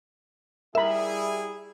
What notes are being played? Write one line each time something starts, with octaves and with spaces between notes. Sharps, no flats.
G3 E4 G#4 A#4 E5 B5